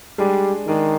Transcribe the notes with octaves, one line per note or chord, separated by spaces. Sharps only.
G3 G#3 D4 G#4 D5
D#3 G#3 D4 G#4 D5